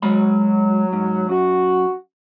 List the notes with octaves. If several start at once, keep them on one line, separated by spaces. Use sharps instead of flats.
F#3 G#3 A#5 B5
G#2
F#2 F#4